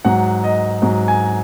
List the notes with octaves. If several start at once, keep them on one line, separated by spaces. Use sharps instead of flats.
G#2 F#3 F#5
D#5
G#2 F#3
G#5